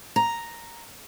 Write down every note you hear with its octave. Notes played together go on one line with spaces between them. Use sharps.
A#5